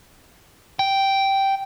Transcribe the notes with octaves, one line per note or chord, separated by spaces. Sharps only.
G5